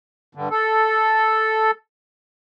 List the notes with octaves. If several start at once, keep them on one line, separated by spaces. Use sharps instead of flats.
G2 D3
A4